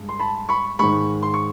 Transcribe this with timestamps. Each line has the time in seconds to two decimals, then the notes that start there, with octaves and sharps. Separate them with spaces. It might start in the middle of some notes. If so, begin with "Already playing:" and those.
Already playing: G2 G#3
0.09 C6
0.19 A5 B5
0.49 B5 C#6
0.79 G#2 D#3 G#3 B5 C#6
1.23 C6
1.34 C#6